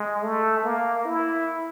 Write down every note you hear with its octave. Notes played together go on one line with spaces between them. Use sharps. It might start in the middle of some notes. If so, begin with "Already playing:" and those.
Already playing: G#3
A3
A#3
E4